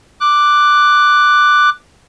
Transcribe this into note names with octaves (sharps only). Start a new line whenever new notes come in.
D6 F#6